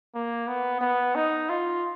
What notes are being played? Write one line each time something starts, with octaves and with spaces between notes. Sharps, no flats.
A#3
B3
B3
D#4
F4